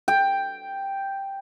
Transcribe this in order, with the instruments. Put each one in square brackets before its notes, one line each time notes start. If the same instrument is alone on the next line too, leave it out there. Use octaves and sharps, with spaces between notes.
[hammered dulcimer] G5